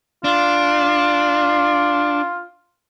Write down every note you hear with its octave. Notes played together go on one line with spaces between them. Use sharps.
D4 F4